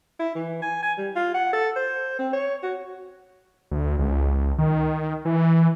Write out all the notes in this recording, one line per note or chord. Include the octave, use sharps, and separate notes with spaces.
E4
E3
G#5
G#5
G3
F4
F#5
A4
C5
C4
C#5
F#4
D2
C#2
D#3
E3